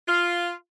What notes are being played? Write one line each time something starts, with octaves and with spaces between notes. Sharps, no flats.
F4